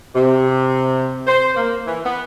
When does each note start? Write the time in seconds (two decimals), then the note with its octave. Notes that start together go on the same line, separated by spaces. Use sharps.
0.15 C3
1.27 C5
1.56 A#3
1.86 E3
2.05 B3